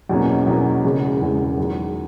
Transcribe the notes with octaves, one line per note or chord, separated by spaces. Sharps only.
E2 B2 F#3 A#3 C#4
E2 B2 F#3 A#3 C#4
E1 E2 C#3 G#3
E1 E2 C#3 G#3
E2 D#3 F#3